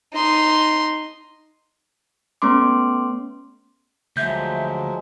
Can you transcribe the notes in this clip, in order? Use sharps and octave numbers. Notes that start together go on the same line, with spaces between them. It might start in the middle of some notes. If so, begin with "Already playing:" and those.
D#4 C6
A3 B3 C#4 C6 D6
D2 F3 F#3 G#3 E5 G6